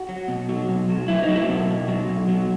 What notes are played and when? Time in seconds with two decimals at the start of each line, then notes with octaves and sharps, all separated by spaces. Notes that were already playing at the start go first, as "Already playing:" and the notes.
Already playing: F#4
0.09 F#3
0.28 B2
0.49 F#3
0.69 B2
0.89 F#3
1.08 F#3 E4
1.23 D#4
1.28 F#3
1.36 E4
1.49 B2
1.68 B2
1.88 F#3
2.09 B2
2.28 F#3